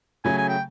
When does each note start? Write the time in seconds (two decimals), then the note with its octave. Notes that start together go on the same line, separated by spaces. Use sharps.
0.24 C#3 F#3 A3 G#5
0.37 G#5
0.49 G5